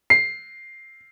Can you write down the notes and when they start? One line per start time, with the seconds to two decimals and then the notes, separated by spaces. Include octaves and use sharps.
0.10 C7